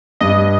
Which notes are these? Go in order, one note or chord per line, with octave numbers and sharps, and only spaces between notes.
G2 D#5